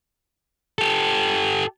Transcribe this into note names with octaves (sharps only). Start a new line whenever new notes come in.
G4 A4